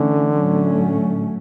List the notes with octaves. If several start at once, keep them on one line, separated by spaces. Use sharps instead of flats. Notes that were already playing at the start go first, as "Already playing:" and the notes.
Already playing: D3 E3 A3 C#4
A2 F#3 A3 C#4